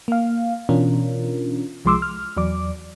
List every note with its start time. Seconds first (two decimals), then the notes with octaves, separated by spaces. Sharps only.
0.08 A#3 F5
0.69 B2 E3 C#4 D4 F4 A#4
1.85 C2 F3 G#3 C6 D6 E6
2.02 F6
2.37 E2 F#3 D5 D6